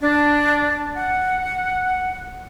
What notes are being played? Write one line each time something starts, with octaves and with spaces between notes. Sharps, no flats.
D4
F#5